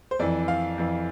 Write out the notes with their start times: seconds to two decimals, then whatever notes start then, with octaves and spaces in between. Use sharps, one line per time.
0.11 C5
0.19 F2 E3 D5
0.48 F5
0.78 F2 E3